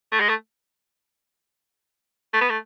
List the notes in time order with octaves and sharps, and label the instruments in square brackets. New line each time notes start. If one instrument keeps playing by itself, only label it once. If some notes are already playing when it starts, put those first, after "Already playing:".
[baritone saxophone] A3
G#3
A3
A3
B3
A3